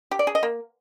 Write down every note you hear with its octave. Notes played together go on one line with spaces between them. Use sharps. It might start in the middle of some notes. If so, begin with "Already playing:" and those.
G4
D5
G#4
D#5
A#3